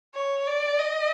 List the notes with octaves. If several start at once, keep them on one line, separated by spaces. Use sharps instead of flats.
C#5
D5
D#5